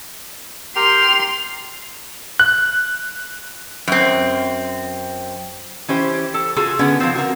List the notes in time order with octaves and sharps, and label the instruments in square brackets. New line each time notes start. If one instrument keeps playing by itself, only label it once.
[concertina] G4 A#4 G5 [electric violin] C6 [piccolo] F7
[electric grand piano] F#6
[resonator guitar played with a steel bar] F#2 C4
E3 C#4 G4 C5
A4
F4 F#4 G#4 A4
D3 B3 C#4
F3 C4
F#4 A#4